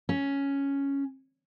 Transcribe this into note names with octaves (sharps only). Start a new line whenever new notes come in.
C#4